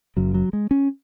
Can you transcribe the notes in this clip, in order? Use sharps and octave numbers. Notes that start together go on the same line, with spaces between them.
F#1 F#2 C#3 F#3
F#3
G#3
C#4